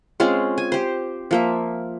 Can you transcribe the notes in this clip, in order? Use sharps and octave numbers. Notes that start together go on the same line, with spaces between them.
G#3 C4 C#4 F4
G#5
G4 C5
F3 A#3 E5